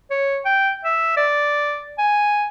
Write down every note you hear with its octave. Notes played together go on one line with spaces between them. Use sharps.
C#5
G5
E5
D5
G#5